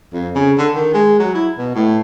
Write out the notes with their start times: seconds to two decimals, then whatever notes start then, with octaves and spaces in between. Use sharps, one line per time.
0.13 F2
0.35 C#3
0.58 D3
0.75 D#3
0.94 G#3
1.20 F#3
1.35 E4
1.58 B2
1.75 A2